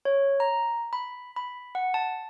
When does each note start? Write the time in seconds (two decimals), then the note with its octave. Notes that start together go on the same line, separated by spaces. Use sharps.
0.05 C#5
0.40 A#5
0.93 B5
1.36 B5
1.75 F#5
1.94 A5